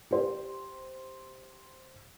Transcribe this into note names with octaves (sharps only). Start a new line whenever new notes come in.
G4 C5